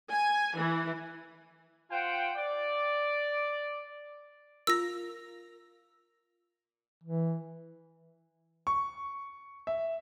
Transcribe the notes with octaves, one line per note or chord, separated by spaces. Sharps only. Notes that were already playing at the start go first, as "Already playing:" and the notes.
G#5
E3
F4 C5 F#5 G5
D5
F4 A#4 E6 A#6
E3
C#6
E5